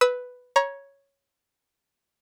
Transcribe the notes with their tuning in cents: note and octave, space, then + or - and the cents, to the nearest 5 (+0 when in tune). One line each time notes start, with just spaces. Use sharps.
B4 +5 E6 -30
C#5 +0 A#5 +30